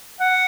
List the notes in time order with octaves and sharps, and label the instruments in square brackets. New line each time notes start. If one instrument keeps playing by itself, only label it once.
[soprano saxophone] F#5